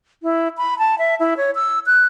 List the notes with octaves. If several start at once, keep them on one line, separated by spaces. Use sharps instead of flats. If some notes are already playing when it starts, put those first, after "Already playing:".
E4
B5
A5
E5
E4
C#5
E6
F#6